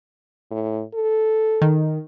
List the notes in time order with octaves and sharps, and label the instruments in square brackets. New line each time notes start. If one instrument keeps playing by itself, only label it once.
[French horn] A2
A4
[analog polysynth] D#3